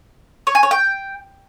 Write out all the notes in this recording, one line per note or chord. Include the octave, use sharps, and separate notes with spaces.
C#5
G#5
C#5
G5